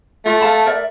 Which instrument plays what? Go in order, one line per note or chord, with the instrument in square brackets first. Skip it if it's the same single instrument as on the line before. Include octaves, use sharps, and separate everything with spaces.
[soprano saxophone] A3 [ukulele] F4
[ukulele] F5 A5 B5
A#4 D5 E5